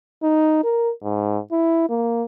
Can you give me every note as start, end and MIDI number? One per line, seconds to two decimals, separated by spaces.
0.23 0.60 63
0.64 0.91 70
1.03 1.39 44
1.52 1.86 64
1.89 2.24 58